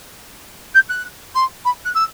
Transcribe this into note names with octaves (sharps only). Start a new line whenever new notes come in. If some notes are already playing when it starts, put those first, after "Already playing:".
G6
F#6
C6
B5
F#6
E6